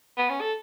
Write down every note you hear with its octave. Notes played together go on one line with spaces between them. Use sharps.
B3
C#4
A4